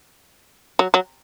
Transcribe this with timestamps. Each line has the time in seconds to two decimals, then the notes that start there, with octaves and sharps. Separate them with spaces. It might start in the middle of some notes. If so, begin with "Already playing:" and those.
0.79 F#3
0.94 F#3